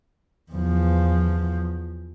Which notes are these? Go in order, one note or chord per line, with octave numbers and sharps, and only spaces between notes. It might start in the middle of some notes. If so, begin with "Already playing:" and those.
E2 F3